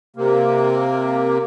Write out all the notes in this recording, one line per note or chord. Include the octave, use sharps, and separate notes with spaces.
C3 A#3